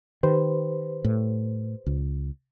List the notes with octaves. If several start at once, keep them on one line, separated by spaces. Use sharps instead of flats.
D#3 G4 B4 C5
A2
C#2